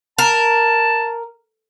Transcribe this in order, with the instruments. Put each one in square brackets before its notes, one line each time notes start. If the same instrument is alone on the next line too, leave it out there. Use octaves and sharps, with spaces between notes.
[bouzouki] A#4 [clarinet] A5